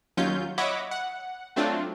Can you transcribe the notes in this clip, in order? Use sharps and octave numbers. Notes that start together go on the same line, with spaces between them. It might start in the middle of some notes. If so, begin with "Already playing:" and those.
D#2 F#3 C#4 F4 G6
C#5 D#5 E5 F#5 B5 D6
F#5
F#3 A3 C4 D4 F4